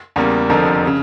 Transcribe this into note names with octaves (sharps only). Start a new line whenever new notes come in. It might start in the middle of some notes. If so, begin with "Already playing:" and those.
E2 C#3 G3 A#3
F1 F2 D3 F3 A#4
C#3